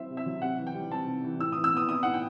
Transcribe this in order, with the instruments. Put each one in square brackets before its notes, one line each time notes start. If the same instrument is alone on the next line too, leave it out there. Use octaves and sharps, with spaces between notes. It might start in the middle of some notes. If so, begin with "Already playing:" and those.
Already playing: [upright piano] F#3 C4 E4 C5 E5
C3
E5
F#3
C3 F#5
E3
G5
G3
C4 A5
C3
E3
A2 E6
E3 D#6
E6
B3 D#6
E4 D#6
A2 F#5
G5